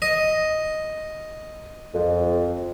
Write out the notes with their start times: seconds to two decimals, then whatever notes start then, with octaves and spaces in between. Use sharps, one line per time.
0.02 D#5
1.94 F2